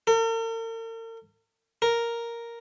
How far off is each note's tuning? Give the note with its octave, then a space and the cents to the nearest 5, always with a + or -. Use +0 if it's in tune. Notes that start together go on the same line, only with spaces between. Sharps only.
A#4 -45
A#4 +0